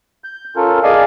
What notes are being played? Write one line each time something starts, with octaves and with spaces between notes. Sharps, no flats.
G6
C#4 F4 A4 A#4
G#4 D5 D#5 F5 G#5